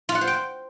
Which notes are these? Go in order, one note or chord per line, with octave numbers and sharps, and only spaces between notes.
F4
F#5
C5
G5